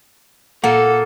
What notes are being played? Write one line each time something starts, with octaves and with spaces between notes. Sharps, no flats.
A#2 A#3 A4 F#5